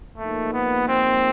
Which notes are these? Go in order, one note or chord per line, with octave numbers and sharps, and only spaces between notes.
G#2 F3 A3 A#3 D#4
B3
C4